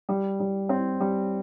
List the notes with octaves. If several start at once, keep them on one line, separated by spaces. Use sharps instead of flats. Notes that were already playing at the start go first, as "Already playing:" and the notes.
G3
G3
C4
G3